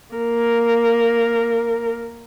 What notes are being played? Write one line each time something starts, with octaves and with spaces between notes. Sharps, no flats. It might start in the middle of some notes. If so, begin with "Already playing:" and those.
A#3 A#4